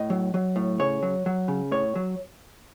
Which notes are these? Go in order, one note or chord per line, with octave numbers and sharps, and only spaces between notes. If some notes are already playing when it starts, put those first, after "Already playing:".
Already playing: A2 D#5
F#3
F#3
A2
C#3 C#5
F#3
F#3
C#3
A2 C#5
F#3